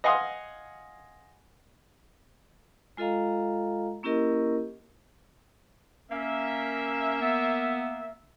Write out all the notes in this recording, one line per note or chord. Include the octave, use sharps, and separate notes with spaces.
D#5 F5 F#5 G#5 C6 D#6
G#3 F4 A4 D#5 F5 A#5
A#3 C#4 E4 G4 A#4 D#5
A#3 C#4 E5
B3